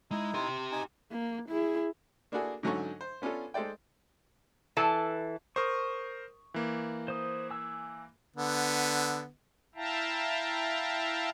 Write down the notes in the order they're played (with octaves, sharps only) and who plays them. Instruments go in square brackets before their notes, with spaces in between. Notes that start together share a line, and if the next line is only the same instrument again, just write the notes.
[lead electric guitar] G#3 [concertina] D#4 E4
[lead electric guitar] G4 C6
[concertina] D#4 G#5
[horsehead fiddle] A#3
E4 G#4
[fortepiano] A#3 D4 E4 F#4 G#4 A4
G#2 D3 F#3 C#4 A4 C#6
C5
B3 C#4 D4 F4 A4
G#3 A4 C5 D5 G5
[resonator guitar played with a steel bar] E3 A4 A5
[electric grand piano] A#4 C5 [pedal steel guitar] C#6 D#6
[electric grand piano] E3 A#3
[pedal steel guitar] C5 D#6
G#5 E6
[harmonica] D3 B3
[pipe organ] E4 E5 F5 G5 A5 A#5